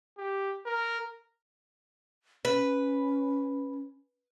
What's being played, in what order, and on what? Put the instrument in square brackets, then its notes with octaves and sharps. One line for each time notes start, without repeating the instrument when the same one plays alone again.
[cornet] G4
A#4
[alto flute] C#4 [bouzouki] B4